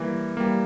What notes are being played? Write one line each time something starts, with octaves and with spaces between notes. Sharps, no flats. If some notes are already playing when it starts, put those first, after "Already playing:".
Already playing: E3 G3 A#3
G3 A#3